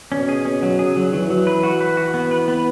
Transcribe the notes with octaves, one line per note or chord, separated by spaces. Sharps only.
B2 C#4
G#4
B2 C#4
F#3
C#3 G#4
F#3
E3 F#3
F#3
B4
F#4
B4
F#4
B3
B4
B3